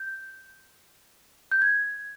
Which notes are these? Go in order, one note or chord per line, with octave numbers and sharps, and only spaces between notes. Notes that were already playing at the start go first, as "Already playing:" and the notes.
Already playing: G6
G6
G#6